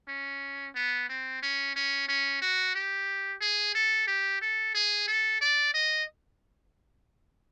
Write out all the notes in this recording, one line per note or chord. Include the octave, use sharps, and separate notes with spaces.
C#4
B3
C4
C#4
C#4
C#4
F#4
G4
G#4
A4
G4
A4
G#4
A4
D5
D#5